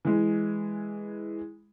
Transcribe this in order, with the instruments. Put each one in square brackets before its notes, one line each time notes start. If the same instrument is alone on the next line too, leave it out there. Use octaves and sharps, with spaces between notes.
[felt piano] E3 G#3